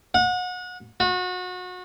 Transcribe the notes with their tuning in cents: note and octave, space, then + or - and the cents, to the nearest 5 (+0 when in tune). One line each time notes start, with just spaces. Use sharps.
F#5 -30
F#4 -30